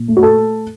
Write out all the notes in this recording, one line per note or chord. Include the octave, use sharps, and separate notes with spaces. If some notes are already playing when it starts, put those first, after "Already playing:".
Already playing: A#2
A3
F#4
A4